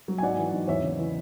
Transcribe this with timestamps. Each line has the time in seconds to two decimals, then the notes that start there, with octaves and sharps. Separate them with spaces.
0.08 F#3
0.18 G#5
0.22 G#2 D5 F#5
0.38 E3
0.54 G#2
0.68 E2 C#5 E5
0.83 C#3
0.98 E3